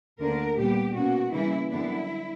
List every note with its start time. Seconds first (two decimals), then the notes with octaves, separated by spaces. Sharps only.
0.20 D2 D3 A#3 D4 A#4
0.57 A#2 G3 B3 G4
0.95 B2 A#3 C#4 F#4
1.32 C#3 E3 G3 A#3 C#4 E4
1.70 F#2 D3 G3 B3 D4 E4